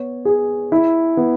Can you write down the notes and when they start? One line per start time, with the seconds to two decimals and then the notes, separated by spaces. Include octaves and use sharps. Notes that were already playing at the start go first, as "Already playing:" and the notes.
Already playing: B3 C#5
0.25 G#4
0.72 E4
1.17 B3